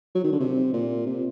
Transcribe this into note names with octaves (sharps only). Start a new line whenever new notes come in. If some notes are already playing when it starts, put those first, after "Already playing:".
F#3
D#3
D3
C3
A#2
C3